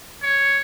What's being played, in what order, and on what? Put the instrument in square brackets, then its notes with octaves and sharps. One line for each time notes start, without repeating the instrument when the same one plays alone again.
[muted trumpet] C#5